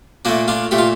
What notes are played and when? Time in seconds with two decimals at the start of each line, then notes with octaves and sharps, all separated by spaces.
0.25 A#2 A3 A#3 D4
0.48 D4 F4
0.71 A#2 A3 G4
0.78 F4